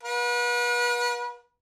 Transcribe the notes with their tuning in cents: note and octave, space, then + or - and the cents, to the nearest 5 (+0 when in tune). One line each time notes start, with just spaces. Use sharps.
B4 -35 F#5 -45